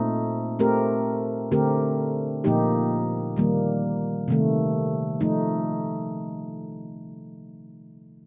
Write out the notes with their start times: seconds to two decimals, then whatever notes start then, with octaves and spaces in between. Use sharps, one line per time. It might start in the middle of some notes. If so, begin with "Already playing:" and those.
Already playing: A#2 A3 C4 D#4
0.59 A3 C4 G4 A#4
1.52 D3 A3 C4 G4 A#4
2.44 A#2 F3 A#3 D#4 G4
3.36 D#3 G3 A#3
4.28 C3 D#3 A3
5.21 F3 A3 D#4